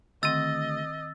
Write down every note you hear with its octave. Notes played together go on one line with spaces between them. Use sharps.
D2 D#3 C4 D#5 E6 A6